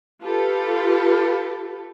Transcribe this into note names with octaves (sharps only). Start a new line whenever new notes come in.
F4 G4 A4 B4